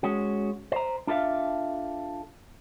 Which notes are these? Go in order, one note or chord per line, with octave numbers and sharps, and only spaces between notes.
G#3 C#4 F#4
C5 A#5
D4 F4 A4 E5 F5